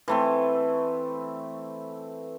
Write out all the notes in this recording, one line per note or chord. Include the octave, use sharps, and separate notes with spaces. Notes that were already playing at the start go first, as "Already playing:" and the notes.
E3 A3 C4